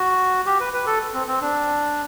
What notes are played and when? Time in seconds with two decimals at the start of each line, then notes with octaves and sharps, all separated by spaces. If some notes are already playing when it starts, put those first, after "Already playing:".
Already playing: F#4
0.46 G4
0.60 B4
0.73 B4
0.87 A4
1.14 C4
1.27 C4
1.41 D4